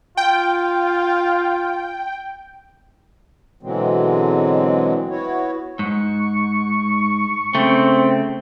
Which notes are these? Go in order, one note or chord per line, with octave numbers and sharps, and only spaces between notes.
F4 G5
B2 D3 E3 F#3 G#3 C4
B3 E4 F#4 C#5
G#2 C#6
C#3 A3 C4